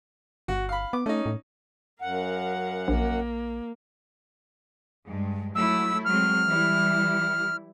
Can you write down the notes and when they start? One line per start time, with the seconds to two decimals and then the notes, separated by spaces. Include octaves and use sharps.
0.48 G1 F#4
0.69 F5 B5
0.93 B3 D6
1.06 A3 C#4 D#4
1.26 A2
2.02 F#2 A#4 F5 F#5
2.88 A#1 A#3
5.08 G2 G#3
5.55 F#3 A3 E4 E6
6.05 F#3 G#3 C4 F6
6.46 E3 G3 E4